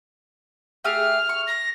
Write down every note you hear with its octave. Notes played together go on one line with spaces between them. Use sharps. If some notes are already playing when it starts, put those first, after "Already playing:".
A3 G4 G#4 F6
C#6
A#6